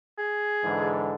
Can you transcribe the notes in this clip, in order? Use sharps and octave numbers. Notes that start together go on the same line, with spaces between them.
G#4
G#2 D3 E3